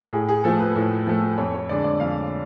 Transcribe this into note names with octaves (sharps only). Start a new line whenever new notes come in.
A2 G#4
G#4
F3 A3 A4
B4
A2
F3 A3
F2 C#5
C#5
D3 G#3 D4 D5
D5
F2 F5